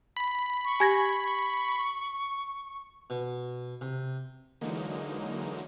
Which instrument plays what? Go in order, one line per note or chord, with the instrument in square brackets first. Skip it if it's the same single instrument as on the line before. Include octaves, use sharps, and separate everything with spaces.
[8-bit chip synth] B5
[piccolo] C#6
[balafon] G4 [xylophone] G#5 G#6 A#6
[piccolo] C#6
[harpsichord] B2
C3
[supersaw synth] D3 E3 F#3 G#3 A#3 D#4